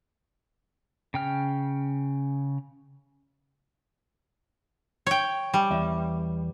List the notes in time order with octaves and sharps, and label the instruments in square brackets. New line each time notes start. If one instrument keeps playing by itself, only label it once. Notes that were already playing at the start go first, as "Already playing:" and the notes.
[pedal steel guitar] C#3 G5 F6
[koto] C#5 G5
[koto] G3 [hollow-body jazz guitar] G#5
[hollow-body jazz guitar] E2 D5 E5